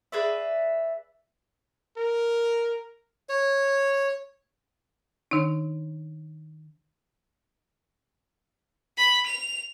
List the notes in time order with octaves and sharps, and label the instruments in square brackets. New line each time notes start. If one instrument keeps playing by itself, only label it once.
[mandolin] G#4 B4 D5 E5
[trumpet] A#4
[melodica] C#5
[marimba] D#3 D4 D#4
[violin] B5
F7